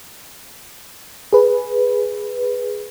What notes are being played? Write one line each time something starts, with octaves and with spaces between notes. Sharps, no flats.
G#4 B4